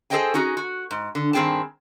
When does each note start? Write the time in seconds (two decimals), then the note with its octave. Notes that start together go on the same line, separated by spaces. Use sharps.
0.10 G#4 A4 C5 D#5 G5 G#5
0.34 C#4 D#4 F#4 G#4
0.57 F#4
0.91 G#2
1.15 D3
1.33 G2 D#3 C4 G#4 G5 A5